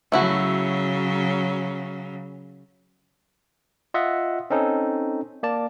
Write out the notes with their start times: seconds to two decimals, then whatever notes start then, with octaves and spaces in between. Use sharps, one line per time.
0.12 C#3 F#3 A3 E4 F#4
3.94 F4 D#5 E5 F#5
4.50 C4 C#4 D#4 A4
5.43 A#3 D5 A5